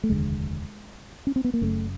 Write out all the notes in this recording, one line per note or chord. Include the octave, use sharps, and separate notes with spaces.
A3
F1 D#2 D3 G#3
C#4
C4
B3
A#3
F#1 F#2 C#3 A3